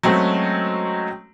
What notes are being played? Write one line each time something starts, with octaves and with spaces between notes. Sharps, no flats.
F#3 G#3 A3 C4 C#4 F#4